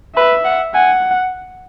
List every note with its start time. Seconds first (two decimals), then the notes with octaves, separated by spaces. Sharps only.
0.15 B4 E5
0.44 F#5
0.74 F#5 G#5